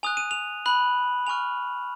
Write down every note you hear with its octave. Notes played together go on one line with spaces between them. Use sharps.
G#5 D#6 F#6 F7
D#7
F7
B5 F#6 F#7
G#5 C#6 F6 F7